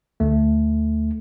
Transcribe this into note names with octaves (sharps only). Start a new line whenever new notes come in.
D2 A3